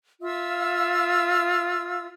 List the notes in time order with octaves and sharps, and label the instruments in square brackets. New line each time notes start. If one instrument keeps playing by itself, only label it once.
[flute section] F4 E5 F5 E6